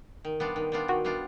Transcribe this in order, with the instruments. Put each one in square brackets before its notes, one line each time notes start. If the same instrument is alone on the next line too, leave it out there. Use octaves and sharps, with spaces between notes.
[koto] D#3
G3 B3 D4 F4
D#3
G3 B3 D4 F4
[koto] D#3 [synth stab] F#4
[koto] G3 B3 D4 F4